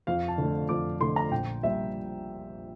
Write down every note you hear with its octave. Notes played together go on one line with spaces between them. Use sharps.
F2 F5
A5
D3 A3
F2 D6
D3 A3 C6
A#5
A#1 G5
A#2 G3 E5